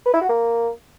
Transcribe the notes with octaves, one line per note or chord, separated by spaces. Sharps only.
B4
E4
F#4
A#3